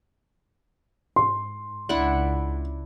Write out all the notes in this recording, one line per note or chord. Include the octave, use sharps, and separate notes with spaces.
G#2 C6
C#2 D4 E4 F#5